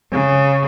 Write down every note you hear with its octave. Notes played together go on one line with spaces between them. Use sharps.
C#3